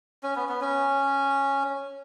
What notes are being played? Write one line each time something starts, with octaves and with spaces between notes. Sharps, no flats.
C#4
B3
B3
C#4